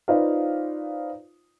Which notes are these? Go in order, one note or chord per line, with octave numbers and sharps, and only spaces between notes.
D#4 F4 B4 C5 D5 F5